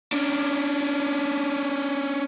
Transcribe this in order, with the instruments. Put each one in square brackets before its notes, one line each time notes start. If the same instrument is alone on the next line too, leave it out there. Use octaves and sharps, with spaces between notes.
[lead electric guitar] C#4 D4